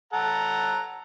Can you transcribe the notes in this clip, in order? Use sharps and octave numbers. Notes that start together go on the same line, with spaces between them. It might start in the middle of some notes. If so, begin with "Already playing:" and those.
A4 F#5 A#5